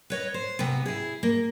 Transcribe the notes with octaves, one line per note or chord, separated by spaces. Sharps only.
B4 C#5 D#5
C5
C3 G#3 B3
E4 G#4
A#3